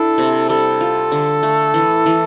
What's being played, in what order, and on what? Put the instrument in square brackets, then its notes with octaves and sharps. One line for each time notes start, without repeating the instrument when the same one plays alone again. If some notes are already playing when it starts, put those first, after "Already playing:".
Already playing: [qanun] D4 E4 [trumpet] A4
[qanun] C3
[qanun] G3 [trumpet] A4
[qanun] F4
D3
A3
E3
E3